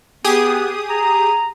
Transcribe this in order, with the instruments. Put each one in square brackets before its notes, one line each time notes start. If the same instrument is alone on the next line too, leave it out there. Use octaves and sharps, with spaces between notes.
[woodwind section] B3 [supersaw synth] G4 G#4 D#6
[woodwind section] A#5